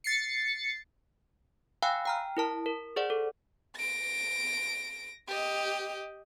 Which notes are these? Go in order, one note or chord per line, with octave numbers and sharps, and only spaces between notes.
A6 C7 C#7
F5 G5 G#5 B5 E6 F#6
G5 A#5 F6
E4 A#4 A5
A#4
G#4 C5 D5 F#5
A4
A#6 D7
G4 D#5